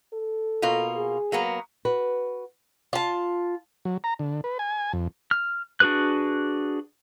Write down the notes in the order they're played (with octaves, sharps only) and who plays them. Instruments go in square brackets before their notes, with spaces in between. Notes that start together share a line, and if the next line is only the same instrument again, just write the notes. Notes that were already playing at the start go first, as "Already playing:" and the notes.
[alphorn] A4
[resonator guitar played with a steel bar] B2 A#3 F4
[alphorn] G#4
[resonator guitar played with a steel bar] F#3 A#3 B3
[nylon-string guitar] F#4 B4
[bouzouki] F4 A5
[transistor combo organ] F#3
A#5
D3
B4
G#5
F2
[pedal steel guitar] F6
D4 F#4 G#4 B4 F#6